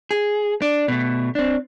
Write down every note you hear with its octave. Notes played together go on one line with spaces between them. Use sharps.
G#4
D4
B2 A3
C4 D4